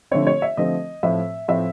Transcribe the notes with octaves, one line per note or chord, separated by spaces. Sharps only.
D3 F3 A3 C4 C#5
C#5
E5
D3 F3 A3 C4 D#5
A2 F3 A3 C4 E5
A2 F3 A3 C4 E5